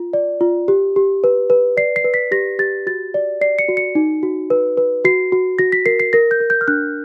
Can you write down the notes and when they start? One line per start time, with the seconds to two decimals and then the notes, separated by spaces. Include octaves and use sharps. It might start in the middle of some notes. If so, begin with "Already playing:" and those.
Already playing: F4
0.13 D5
0.41 F4
0.68 G4
0.96 G4
1.24 B4
1.50 B4
1.77 D5 C7
1.96 C7
2.04 B4
2.14 B6
2.31 G4 A#6
2.59 G4 A6
2.87 F#4 A6
3.14 D5
3.41 D5 C7
3.59 C#7
3.69 F#4
3.77 C#7
3.95 D#4
4.23 F#4
4.50 B4
4.77 B4
5.04 F#4 C7
5.32 F#4
5.59 F#4 A#6
5.72 B6
5.86 A#4 C7
6.00 C7
6.13 A#4 A#6
6.31 G6
6.40 A#4
6.50 G6
6.61 F6
6.68 D4 F#6